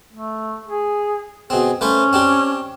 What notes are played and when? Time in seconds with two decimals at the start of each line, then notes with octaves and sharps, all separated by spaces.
0.12 A3
0.68 G#4
1.50 B2 C4 G#4
1.81 A3 C#4 B4 C5
2.13 C4 D4 G4